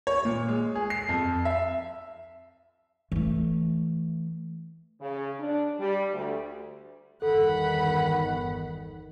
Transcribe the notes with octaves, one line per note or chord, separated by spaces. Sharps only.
C#5
A#2
G#3
G#4
C7
F2
E5
E3 A3
C#3
D4
G3
D2
G1 E2 D#3 A4 F#5 B5